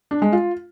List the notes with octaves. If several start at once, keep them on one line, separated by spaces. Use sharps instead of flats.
D4
G#3
F4